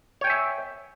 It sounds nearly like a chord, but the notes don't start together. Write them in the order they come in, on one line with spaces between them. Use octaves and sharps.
C#5 G5 G#5 E5